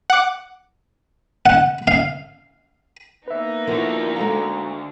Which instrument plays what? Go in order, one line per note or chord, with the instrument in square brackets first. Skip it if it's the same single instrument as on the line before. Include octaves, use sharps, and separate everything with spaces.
[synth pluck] F#5 D6
[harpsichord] F#5
F5
[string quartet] A#3 B3 D#4 [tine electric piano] B4 E5
[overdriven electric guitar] D3 F#4 [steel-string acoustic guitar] F3 E4 A#4
[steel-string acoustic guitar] G#3 A4 F5 [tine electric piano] A#5